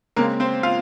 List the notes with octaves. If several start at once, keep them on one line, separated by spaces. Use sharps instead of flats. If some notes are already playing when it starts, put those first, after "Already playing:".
C#3 G#3 A#3 C4 A#4
C4 C5
F4 F5